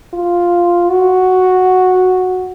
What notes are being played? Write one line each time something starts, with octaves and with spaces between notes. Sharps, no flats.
F4
F#4